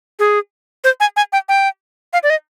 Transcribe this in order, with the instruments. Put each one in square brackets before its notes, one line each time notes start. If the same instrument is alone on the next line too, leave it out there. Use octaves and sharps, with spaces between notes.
[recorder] G#4
C5
G#5
G#5
G5
G5
F5
D5
D#5